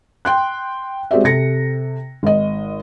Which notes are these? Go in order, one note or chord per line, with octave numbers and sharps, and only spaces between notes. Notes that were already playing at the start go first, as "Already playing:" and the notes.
G5 C6 F#6
G#3 C4 F#4 G4 D5 E5
C3 A4 A#6 C#7
G#1 D#5